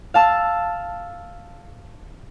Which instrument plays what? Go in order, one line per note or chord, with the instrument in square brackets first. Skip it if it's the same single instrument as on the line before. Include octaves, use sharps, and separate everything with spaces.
[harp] F5 A5 E6